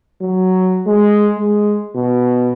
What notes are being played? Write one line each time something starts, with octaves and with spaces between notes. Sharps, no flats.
F#3
G#3
G#3
B2